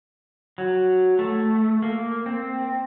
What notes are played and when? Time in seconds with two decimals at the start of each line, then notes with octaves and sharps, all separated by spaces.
0.58 F#3
1.19 A3
1.82 A#3
2.26 C4